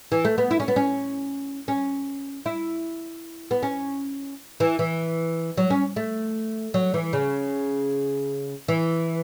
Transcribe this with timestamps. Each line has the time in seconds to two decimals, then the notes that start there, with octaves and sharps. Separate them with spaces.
0.12 E3
0.25 A3
0.38 B3
0.51 E4
0.60 C#4
0.68 B3
0.76 C#4
1.68 C#4
2.46 E4
3.51 B3
3.63 C#4
4.60 E3
4.79 E3
5.57 F#3
5.70 C#4
5.96 A3
6.74 F#3
6.94 E3
7.13 C#3
8.68 E3